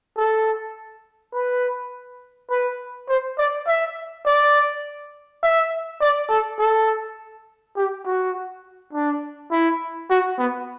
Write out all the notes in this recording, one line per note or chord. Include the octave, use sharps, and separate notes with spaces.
A4
B4
B4
C5
D5
E5
D5
E5
D5
A4
A4
G4
F#4
D4
E4
F#4
B3